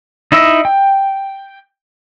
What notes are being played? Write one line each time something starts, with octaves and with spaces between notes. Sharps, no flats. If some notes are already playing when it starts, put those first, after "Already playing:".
D#4 E4 D#5 E6
G5